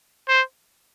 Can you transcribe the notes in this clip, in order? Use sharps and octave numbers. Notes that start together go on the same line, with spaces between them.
C5